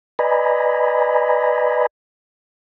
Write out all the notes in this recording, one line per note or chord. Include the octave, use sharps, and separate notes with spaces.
B4 D5 D#5 G#5 A#5 B5